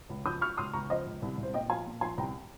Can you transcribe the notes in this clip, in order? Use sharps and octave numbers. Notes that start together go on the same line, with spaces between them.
C#2
F3 D#6 G6
F3 C#6 F6
C#2 C6 D#6
C#2 A#5 C#6
F3 C5 D#5
C#2
C2
C2
C5
A#2 D#5 G5
F3 F5 G#5
A#2
F3 G#5 C6
C2 G5 A#5